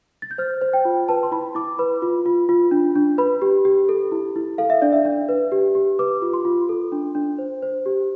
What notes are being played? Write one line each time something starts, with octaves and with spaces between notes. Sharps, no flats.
A6
G6
C5 F6
C5
G5
F4
B4 A5
C6
E4 B5
E4 D6
B4 B5
F4
F4
F4
D4
D4
B4 B5
G4
G4
A4
E4
E4
A4 F5
E5
D4 D5
E5
D4
B4
G4
G4
B4 D6
F4
C6
F4
A4
D4
D4
C5
C5
G4